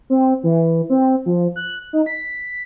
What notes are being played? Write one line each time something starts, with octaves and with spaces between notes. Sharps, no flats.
C4
E3
C4
F3
F#6
D#4
B6